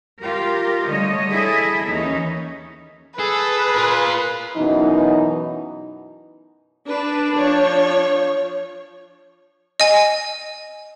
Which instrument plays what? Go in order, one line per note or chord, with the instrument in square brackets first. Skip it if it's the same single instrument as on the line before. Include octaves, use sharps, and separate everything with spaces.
[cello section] F4 G4 A#4
D3 G3 A3 C#5 D#5
E4 G#4 A4 D#5 E5
D#2 E3 C#4 D#4
[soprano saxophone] G#4 [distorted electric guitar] A4 [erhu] B4
[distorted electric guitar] F4 A#4
[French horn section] F#2 B2 E3 B3 D#4
[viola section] D4 [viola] B4
[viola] F3 C#5
[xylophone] D#5 G#5